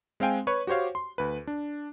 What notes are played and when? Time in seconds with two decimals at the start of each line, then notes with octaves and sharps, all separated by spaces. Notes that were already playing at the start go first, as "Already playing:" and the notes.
0.20 G#3 C4 F5 G5 G#5
0.47 B4 C#5 C#6
0.67 F#4 G4 C5 C#5 F5
0.95 C6
1.18 D2 B4
1.47 D4